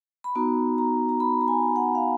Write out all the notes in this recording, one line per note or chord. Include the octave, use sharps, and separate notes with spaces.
B5
B3 D#4 F#4 A#5
A#5
A#5
B5
A#5
G#5
F#5
F5